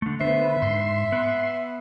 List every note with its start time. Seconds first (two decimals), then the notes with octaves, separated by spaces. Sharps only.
0.02 D3 A3
0.21 D3 B3 B4 C5 E5
0.62 G#2 C6
1.12 B3 B4